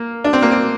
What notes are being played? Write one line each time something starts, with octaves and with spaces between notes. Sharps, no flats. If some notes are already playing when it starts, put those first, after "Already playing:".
Already playing: A#3
D4
C4
A#3
C4